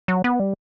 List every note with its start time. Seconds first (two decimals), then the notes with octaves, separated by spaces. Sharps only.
0.08 F#3
0.24 B3
0.40 G3